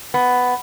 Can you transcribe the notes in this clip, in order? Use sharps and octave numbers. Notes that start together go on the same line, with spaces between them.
B3